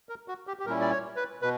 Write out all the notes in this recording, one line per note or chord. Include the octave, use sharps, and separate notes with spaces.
A#4
F#4
G4
G4
A#2 G3 C#4 E4 A#4
D5
C#5
B4
B2 B4